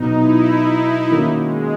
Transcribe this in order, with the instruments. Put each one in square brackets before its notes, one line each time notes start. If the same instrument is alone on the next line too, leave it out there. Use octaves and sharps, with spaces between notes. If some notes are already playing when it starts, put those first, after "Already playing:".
Already playing: [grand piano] B2 F#3 B3 [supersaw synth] D#4
[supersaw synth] E4
E4
[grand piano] D#3 A#3 C#4 F#4
[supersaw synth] G#3